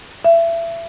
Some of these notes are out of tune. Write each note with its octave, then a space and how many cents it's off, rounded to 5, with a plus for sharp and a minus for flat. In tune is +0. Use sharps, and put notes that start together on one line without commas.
E5 +25